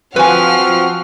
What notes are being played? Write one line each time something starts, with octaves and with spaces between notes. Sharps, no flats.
F3 C4 F#4 B4 F#5 G#5 F6